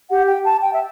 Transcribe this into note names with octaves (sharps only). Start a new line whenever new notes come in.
G4 F#5
G5
A5
G5
E5